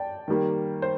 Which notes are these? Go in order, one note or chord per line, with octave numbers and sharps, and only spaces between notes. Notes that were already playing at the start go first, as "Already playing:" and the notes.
Already playing: D5 G5 A5
D#3 G3 A#3
C5